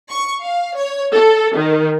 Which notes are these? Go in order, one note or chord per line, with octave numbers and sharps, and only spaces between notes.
C#6
F5
C#5
A4
D#3